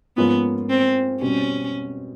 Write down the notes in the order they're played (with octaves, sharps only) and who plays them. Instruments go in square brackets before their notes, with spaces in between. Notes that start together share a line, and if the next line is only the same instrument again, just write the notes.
[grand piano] G#2 F3 A#3 C#4 F4 [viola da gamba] B3
[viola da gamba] C4
[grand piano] B2 G3 C4 [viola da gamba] C#4